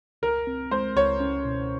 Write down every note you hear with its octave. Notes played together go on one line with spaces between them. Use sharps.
C#2 A#4
C4
G#3 C5
C#2 C#5
C#4
B2